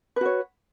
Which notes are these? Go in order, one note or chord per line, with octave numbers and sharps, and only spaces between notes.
F#4 B4 C#5